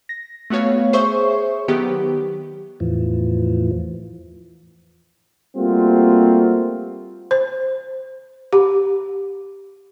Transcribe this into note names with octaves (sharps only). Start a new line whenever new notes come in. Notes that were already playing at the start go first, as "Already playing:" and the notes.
A#6
A3 B3 F#4 C#5 F5
G#4 C5 C#5 E5 C#6
D#3 F#3 B3 G4
E2 A2 E3 F3
G3 A3 A#3 C4 F4 F#4
C5
G4